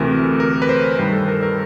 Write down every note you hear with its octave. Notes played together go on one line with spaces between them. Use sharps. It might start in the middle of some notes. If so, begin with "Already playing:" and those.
Already playing: D2 C3 E3 A3 A#4
A#4
B4
C5
G2 D#3 G3 C5
A4
A#4
A#4